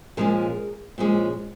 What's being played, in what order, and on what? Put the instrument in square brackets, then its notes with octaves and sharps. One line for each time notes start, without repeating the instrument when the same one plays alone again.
[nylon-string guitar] A#2 F3 G#3 C#4 G#4 A#4
A#2 F3 G#3 C#4